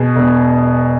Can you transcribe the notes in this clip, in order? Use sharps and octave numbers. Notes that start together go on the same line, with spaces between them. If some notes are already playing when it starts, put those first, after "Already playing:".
Already playing: B2 G#4
E1